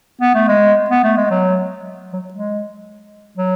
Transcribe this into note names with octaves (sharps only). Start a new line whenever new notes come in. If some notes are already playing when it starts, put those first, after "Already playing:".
B3
A3
G#3
B3
A3
G#3
F#3
F#3
G#3
F#3